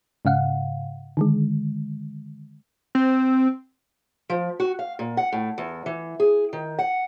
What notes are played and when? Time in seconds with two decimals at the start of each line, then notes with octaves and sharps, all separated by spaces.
0.25 G#2 C#3 F5 F#5
1.17 D3 D#3 G#3
2.95 C4
4.30 F3
4.60 F#4
4.79 F5
4.99 A#2
5.17 F#5
5.32 A2
5.58 E2
5.86 E3
6.20 G#4
6.53 D#3
6.79 F#5